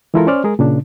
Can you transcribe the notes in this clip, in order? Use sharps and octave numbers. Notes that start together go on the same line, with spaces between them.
E3 G#3 E4 F4 A4 A#4
C#4 C5 D5 F6
G#3 G#4 A#4
A#2 C#3 D4